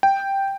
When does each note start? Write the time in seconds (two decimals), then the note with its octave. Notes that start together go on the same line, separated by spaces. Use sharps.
0.03 G5